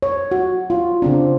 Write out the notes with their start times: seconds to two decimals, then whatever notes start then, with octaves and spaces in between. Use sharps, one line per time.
0.02 C#5
0.31 F#4
0.70 F4
1.02 C#3 C4 D4